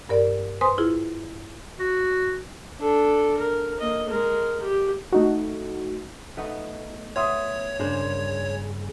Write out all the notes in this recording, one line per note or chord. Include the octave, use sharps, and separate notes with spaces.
G2 A#4 D5
B4 C5 G#5 C6 D#6
E4 F4 G#4
F#4
D4 A4
A#4
A#3 D#5
G#3 A#4
G4
A3 D#4 F#4
A3 B3 D#4
B3 C#5 E5 C6 D#6
G2 C#3 A#3 D4 G#4 C5